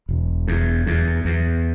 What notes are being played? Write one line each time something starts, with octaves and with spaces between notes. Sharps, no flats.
E1
E2
E2
E2